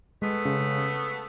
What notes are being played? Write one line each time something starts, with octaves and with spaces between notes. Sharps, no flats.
G#3 A3 B3
C#3